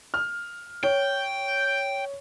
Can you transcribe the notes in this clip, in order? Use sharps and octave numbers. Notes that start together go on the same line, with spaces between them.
F6
C#5 G5